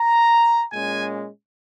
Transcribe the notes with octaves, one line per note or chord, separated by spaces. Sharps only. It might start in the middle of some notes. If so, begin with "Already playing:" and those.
Already playing: A#5
A#2 G#3 C#4 G#5